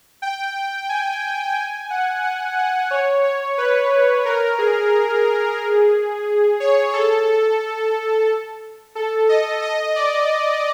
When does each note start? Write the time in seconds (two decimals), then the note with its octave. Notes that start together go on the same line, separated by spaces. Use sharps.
0.22 G5
0.89 G#5
1.56 G#5
1.90 F#5
2.24 F#5
2.57 F#5
2.91 C#5
3.24 C#5
3.58 B4
4.25 A#4
4.59 G#4
6.60 C#5
6.93 A4
8.95 A4
9.29 D#5
9.62 D#5
9.96 D5